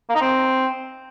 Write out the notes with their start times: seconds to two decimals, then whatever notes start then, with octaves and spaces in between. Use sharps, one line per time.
0.09 A#3
0.15 D#4
0.21 C4